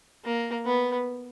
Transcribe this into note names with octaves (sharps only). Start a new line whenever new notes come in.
A#3
B3